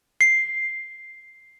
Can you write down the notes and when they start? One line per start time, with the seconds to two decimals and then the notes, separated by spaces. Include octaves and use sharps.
0.21 C7